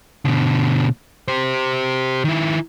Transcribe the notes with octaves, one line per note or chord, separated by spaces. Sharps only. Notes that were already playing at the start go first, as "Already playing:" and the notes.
B2 D3
G4 C5
D#3 E4